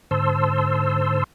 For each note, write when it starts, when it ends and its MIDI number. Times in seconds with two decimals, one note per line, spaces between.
0.11 1.24 44
0.11 1.24 50
0.11 1.24 72
0.11 1.24 81
0.11 1.24 84
0.11 1.24 88